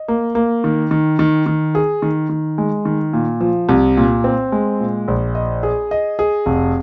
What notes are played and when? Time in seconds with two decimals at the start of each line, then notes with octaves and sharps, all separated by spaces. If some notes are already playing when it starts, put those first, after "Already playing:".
Already playing: D#5
0.08 A#3
0.35 A#3
0.64 D#3
0.91 D#3
1.19 D#3
1.46 D#3
1.75 G#4
2.02 D#3
2.29 D#3
2.58 G#3
2.85 D#3
3.13 A#2
3.40 F3
3.69 C2
3.97 A#2
4.24 C4
4.52 G#3
4.80 A#2
5.08 A#1
5.35 D#5
5.63 G#4
5.91 D#5
6.19 G#4
6.46 F1